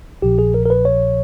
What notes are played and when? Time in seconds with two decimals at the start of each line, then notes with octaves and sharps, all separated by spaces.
0.22 A#1 A#2 F3 G4
0.39 G#4
0.54 A#4
0.66 A#4
0.70 B4
0.85 C#5